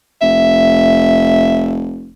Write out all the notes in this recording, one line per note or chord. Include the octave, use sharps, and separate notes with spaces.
F1 E5